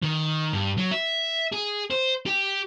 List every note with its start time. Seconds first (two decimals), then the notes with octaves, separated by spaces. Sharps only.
0.03 D#3
0.53 G2
0.78 F#3
0.91 E5
1.53 G#4
1.91 C5
2.26 G4